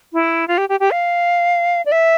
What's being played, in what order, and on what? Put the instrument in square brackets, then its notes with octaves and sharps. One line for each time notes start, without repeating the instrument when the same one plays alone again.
[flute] E4
F4
G4
G4
G4
F5
D5
E5